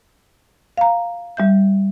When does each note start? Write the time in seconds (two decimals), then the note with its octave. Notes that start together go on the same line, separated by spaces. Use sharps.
0.77 F5 A#5
1.37 G3 E5 G6